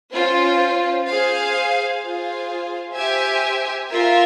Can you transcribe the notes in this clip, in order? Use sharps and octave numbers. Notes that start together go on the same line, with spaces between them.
C#4 F4 C5
G#4 C5 F5
F4 G#4 C5 F5
G4 C5 E5 G#5
F4 A#4 E5